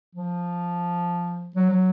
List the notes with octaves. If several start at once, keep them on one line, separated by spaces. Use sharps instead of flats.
F3
F#3
F#3